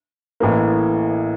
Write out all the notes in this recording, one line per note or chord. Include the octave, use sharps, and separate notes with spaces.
A1 A2 E3 A#3